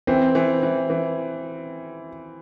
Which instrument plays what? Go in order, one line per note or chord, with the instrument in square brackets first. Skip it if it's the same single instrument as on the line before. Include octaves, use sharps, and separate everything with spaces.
[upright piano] E3 [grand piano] C4
[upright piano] E3
E3
E3